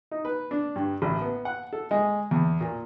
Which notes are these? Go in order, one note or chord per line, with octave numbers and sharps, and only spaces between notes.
D#4
B4
D4
G2
A1
B3
F#5
A4
G#3
E2
A#2